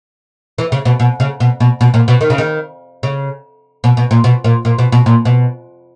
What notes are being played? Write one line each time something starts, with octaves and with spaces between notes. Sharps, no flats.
E3
C#3
B2
B2
C#3
B2
B2
B2
A#2
B2
D#3
C#3
D#3
C#3
B2
B2
A#2
B2
A#2
A#2
B2
B2
A#2
B2